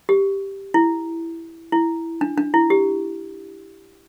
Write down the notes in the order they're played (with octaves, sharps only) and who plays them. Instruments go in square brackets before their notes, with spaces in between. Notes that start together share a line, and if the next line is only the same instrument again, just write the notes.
[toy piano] G4
E4
E4
D4
D4
E4
G4